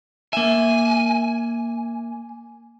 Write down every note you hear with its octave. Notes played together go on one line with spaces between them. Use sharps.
A#3 E5 G#5